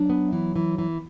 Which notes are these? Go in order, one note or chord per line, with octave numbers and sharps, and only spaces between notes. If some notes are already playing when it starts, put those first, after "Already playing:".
Already playing: F#3 D4
B3
E3
E3
E3